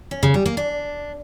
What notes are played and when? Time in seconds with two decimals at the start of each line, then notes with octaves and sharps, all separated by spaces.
0.11 C#4
0.23 C#3
0.34 G3
0.46 A#3
0.57 D4